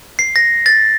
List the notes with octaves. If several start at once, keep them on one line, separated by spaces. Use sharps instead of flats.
C7
A#6
A6